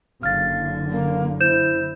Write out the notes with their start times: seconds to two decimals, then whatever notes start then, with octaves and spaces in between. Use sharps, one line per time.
0.23 F#1 D3 F5 F6 A6
0.91 A#3
1.40 E4 C5 G6 E7